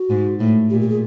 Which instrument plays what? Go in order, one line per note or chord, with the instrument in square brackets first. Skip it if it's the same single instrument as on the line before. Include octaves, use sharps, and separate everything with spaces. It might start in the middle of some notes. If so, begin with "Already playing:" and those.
Already playing: [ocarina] F#4
[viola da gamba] G#2
A2
[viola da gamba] A#2 [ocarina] G4
[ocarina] G4
G#4